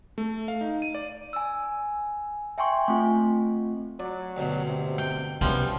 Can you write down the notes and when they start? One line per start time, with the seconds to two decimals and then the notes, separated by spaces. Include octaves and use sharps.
0.18 A3
0.48 F5
0.61 D#4
0.82 D#7
0.95 D5
1.33 G#5 E6
2.58 E5 G5 G#5 C6 C#6
2.88 A3 C4 F4
4.00 F#3 D5
4.37 D2 G2 B2
4.67 C3
4.98 G5
5.41 C2 F#2 E3 F3 G3 B3